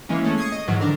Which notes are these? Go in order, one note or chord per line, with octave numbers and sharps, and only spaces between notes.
E3 G#3 A#3 C#4
G#3 A3 C#4
C#6 D#6 G#6 C7
D#5
G#2 D#3 E3 F#3
D3 D4 A#4